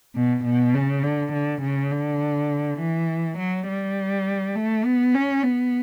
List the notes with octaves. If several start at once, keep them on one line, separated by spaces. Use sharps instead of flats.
B2
B2
C#3
D3
D3
C#3
D3
E3
F#3
G3
A3
B3
C#4
B3